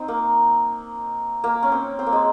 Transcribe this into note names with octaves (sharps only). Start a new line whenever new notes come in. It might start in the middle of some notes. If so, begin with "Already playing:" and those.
Already playing: C4 D#4
A#3
A#3
C#4
C4
C4
A#3
G#3